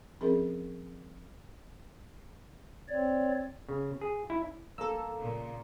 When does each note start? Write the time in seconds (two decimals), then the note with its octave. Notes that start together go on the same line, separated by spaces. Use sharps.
0.21 F3 C4 C#4 G#4 A#4
2.88 C4 C#5 D5
3.69 C#3
4.01 G#4
4.30 E4
4.78 A#3 A4 E6
5.17 A#2 C#3